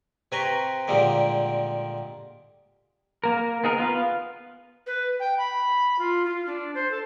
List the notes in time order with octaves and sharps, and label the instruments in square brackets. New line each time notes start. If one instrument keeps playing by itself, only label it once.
[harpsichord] C3 B4 G#5 A#5 C6 C#6
A#2 D3 D#3 G3 G#3 A#3
[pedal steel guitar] A#3 A#4
B3 D#4 G#4 A#4
B3 F4 B4 F5
[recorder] B4
G5
B5
F4
F4
D4
C5
A4